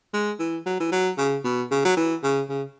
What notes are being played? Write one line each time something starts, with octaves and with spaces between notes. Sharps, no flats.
G#3
E3
F#3
E3
F#3
C#3
B2
C#3
F#3
E3
C#3
C#3